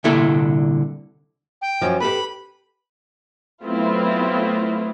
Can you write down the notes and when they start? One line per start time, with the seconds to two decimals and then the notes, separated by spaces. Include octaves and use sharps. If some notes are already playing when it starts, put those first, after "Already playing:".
0.04 C2 A#2 D3 E4 A4
1.62 G5
1.81 F#2 F3
2.00 G4 A4 B4 B5
3.65 F#3 A3 B3 C4 E4 F4